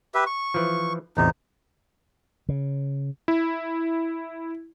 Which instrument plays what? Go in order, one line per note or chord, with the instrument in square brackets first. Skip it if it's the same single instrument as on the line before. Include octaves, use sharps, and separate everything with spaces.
[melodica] G4 B4 E5
C#6
[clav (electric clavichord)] E3 F3
[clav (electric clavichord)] A1 E2 C3 [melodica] D#4
[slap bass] C#3
[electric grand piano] E4